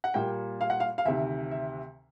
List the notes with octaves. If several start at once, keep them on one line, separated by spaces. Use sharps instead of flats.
F#5
A#2 G3 A#3 G5
F5
F#5
F5
F5
D2 C3 D#3 E5
E5